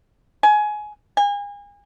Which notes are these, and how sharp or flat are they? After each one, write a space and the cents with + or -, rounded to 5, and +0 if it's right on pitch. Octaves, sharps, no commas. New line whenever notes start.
G#5 +20
G#5 -35